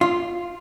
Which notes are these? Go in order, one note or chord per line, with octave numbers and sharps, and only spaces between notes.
F4